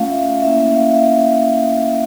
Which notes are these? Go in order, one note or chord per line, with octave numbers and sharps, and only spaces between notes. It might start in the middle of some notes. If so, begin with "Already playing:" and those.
Already playing: A3 C#4 F4 F5 F#5
E5
A#3 C#4 E4 E5
F5
E5